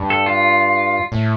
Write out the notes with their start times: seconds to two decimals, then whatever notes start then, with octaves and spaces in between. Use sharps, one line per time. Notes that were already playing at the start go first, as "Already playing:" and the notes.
Already playing: G2
0.10 A4
0.26 F4
1.12 A2